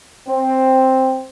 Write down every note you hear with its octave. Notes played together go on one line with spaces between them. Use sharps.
C4